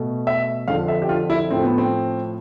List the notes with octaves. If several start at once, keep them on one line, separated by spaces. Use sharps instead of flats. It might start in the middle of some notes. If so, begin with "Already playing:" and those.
Already playing: B2 A3
E5
F2 D3 F3 F5
E5
G4
F4
E4
A2 F3 A3 C4
B3
C4